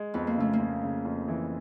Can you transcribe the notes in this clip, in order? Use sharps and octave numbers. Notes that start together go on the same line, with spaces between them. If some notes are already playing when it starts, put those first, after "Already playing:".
Already playing: G#3
F2 B3
A#3
C#3 A3
A#3
F2
C#3
F2
E3